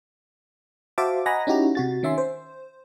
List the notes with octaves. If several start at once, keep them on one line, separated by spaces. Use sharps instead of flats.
F#4 C5 E5 F5 A5 D6
D#5 F#5 G#5 A#5 B5 A#6
C#4 D#4 E4 F#4 G4 A#5
C3 F#4 A6
D#3 C#4 E5 G#5 C6
C5